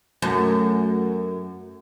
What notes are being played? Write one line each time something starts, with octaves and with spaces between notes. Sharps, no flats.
F#2 A3